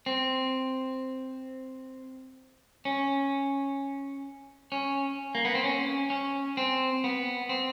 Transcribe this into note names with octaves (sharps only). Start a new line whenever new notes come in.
C4
C#4
C#4
A#3
B3
C4
C#4
C#4
C4
B3
C4